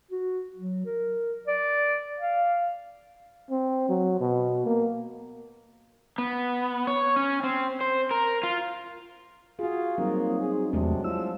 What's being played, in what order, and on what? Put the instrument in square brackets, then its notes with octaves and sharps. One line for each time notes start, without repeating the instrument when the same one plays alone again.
[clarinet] F#4
F#3
A#4
D5
F5
[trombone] C4
F#3
B2
A#3
[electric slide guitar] B3
C#5
C#4
C4
C5
A#4
F4
[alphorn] F4 [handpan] F#4 G#4
[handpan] F#3 G3 [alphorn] A#3 [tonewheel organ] C4 D#4
[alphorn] G#4
[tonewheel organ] E2 A3 [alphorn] C3 [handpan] F#3 G#3 D4
[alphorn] F3 [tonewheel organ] E4 E6